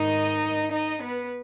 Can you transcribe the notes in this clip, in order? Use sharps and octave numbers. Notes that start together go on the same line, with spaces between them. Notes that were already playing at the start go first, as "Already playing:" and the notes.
Already playing: G#2 D#3 D#4 D#5
D#4 D#5
B3 B4